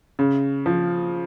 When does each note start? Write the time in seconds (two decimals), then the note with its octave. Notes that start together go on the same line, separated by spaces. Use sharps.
0.19 C#3
0.66 F3